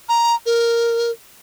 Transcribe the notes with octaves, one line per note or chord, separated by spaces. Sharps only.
A#5
A#4